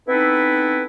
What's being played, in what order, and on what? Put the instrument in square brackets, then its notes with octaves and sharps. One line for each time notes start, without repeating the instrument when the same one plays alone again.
[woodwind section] B3 C4 D#4 E4 A4 B4